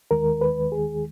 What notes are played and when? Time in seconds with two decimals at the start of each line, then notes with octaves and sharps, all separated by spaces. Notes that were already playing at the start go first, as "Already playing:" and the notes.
0.11 D#2 D#3 G#3 A#4
0.41 B4
0.72 G#4